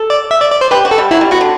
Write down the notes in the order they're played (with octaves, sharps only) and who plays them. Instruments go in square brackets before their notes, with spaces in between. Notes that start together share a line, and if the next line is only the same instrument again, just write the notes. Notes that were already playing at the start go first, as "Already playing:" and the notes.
Already playing: [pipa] A4
[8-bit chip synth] D5
E5
D5
D5
C5
[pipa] G4 [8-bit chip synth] B4
[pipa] F#4
[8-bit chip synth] A4
[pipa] G3
[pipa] F#3 [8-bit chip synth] E4
[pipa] G3
[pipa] B3 [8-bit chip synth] F#4
[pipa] D3